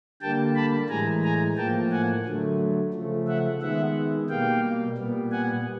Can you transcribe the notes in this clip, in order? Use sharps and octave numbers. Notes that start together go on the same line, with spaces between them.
D3 G3 A#3 G5 A5
A5 B5
A2 E3 G#3 G#5 A#5
G#5 A#5
A2 F3 A#3 G5 A5
F#5 G#5
D3 F#3 A3
C#3 F3 A3
E5 F#5
D#3 G#3 B3 E5 F#5
B2 G3 A#3 F5 G5
A#2 G3 B3
F#5 G#5